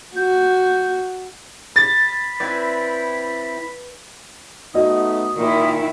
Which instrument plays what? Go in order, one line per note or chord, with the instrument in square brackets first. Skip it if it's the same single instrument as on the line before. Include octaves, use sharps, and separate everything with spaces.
[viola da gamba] F#4 [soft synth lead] G6
[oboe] B5 [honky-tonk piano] A6
[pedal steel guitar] C4 E4 D5 [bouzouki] B4 G#5
[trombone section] A3 B3 D#4 [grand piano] F#4 D#5 [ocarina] D#6
[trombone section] A#2 [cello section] D#3 E4